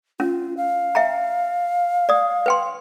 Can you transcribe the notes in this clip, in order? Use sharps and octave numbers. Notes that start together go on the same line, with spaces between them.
C#4 F4
F5
E5 G5 A#5
D5 D#6
B4 G5 C6